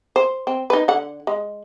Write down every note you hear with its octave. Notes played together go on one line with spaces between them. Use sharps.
C5
C4
D#4 B4
D3 F#5
G#3